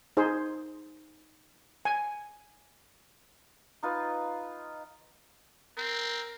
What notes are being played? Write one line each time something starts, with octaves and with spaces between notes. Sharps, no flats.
D#4 G#4 C5
G#5
D#4 F4 B4 D#5
C4 A#4